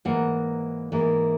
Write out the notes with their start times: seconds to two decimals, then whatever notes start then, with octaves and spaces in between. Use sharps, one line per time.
0.05 G#2 E3 A#3 F#5
0.92 G#2 E3 A#3